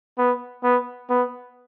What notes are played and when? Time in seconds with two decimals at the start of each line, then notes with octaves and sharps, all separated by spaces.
0.18 B3
0.64 B3
1.10 B3